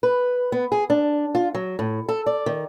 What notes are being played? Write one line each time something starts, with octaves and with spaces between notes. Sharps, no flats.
B4
B3
G#4
D4
F4
F#3
A2
A4
D5
D#3